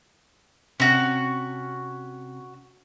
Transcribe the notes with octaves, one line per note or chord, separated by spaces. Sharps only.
C3 C#4 F#4